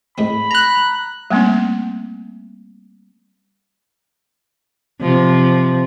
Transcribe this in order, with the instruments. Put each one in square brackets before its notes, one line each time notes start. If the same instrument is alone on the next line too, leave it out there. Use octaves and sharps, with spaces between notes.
[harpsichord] A2 G#3 C4 [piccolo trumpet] B5
[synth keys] A#5 F#6
[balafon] G3 A3 A#3 C4 C#4
[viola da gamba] C3 F3